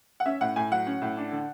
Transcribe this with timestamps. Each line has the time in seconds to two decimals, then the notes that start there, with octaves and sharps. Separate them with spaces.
0.20 F#5
0.25 C#4 E5
0.41 A2 F#5
0.56 A2 G#5
0.72 F#3 F#5
0.87 C#4
1.02 A2
1.17 D4
1.32 D3